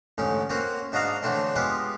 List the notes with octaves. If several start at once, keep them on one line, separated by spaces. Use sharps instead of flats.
A1 D2 G#2 C#4
A#3 C4 C#4 F#4
G#2 D4 F#4 D#5 F5 A#5
D3 E3 F#3 A3 C4 D4
G#3 B3 F4 G4 B4